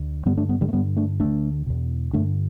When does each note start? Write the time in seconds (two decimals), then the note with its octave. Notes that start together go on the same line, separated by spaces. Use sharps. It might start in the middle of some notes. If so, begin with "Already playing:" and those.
Already playing: D2
0.26 G2 D3 G3 B3
0.37 A3 D4
0.49 G3 B3
0.61 D3 G3
0.69 A3
0.72 G2 D3 G3 B3
0.96 A3 D4
1.20 D2 D3 A3 D4
1.66 E2 B2
2.13 G2 D3 A3 D4